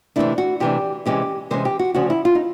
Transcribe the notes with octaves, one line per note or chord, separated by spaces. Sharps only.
C3 E3 A3 D4 E4
F#4
C3 E3 A3 D4 G4
C3 E3 G#3 C#4 G4
C3 E3 G#3 C#4 C5
G4
F#4
D2 C#3 F3 F#4
E4
F4
D#4